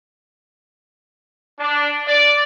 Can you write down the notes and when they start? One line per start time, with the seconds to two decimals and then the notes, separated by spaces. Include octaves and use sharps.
1.60 D4
2.07 D5